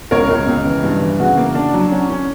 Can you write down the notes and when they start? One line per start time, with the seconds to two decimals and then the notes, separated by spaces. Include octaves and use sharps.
0.11 C#2 A#4 C#5
0.30 C#2
0.48 C#2
0.66 E3
0.84 G2
1.02 E3
1.20 C#3 F#4
1.37 A#3
1.55 D4
1.74 F#3
1.91 C#4
2.10 C#4